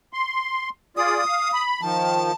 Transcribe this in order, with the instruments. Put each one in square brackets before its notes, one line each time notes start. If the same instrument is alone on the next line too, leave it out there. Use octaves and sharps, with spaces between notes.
[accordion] C6
[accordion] F4 G#4 D5 [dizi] D#6
[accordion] F5
B5
[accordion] D#3 F3 [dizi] A5